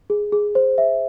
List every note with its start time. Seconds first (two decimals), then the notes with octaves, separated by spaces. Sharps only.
0.10 G#4
0.32 G#4
0.55 C5
0.78 E5